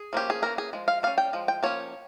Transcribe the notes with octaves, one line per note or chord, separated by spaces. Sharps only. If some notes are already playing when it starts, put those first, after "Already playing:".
Already playing: G#4
F3 A#3 C#4 G4
G#4
E3 A#3 C#4 A#4
G#4
F3 G#3
F5
G3 C#4 F5
G5
F3 G#3
G5
F3 A#3 C#4 C#5